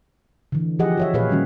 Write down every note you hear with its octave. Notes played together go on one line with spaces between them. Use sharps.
D3 E3
F3 G4 G#4 D#5 F#5
F#4 C#5 E5
A#2 G#4 B4 C#5 F5
D#3 G3 C#4 F#4